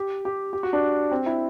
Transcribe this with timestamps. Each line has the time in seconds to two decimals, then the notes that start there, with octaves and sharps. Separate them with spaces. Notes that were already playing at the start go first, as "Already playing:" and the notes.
Already playing: G4
0.25 G4
0.53 G4
0.63 F#4
0.73 D4
1.11 C4
1.26 E4